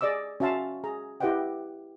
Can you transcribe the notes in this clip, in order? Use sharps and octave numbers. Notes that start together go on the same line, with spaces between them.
G#4 D5 D#5 D6 E6
C#4 F#4 E5 F5 A5 C6
G#4 A#5
E4 G4 B4 D#5 F#5 G5